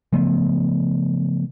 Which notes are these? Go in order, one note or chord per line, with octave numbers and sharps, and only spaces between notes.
C#3 F3 A3 B3